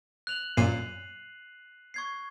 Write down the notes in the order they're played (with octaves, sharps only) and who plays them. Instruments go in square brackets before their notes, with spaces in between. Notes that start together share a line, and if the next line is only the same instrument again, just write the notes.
[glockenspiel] F#6 F7 F#7
[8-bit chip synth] F#2 A#2 [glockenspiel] C7 D#7
[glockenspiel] C#6 G#6 C7